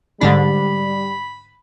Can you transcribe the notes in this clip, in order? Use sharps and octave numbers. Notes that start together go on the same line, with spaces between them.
G#2 D3 G3 D4 B5